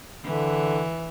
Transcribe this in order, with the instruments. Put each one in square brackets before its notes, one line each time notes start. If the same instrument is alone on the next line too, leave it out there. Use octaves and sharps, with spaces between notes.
[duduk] D3 [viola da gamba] E3